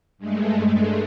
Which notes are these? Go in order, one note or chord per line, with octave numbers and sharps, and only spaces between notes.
G2 G#3 A3